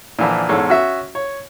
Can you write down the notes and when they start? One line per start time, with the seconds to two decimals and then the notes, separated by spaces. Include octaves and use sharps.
0.19 A#2 D3 E3 F3
0.49 E2 G#2 A4 C#5
0.69 C#4 F#4 E5
1.15 C#5